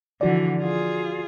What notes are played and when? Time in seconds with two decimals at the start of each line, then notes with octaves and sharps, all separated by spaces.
0.21 D3 E3 F3 F#4 D5
0.62 F4 G#4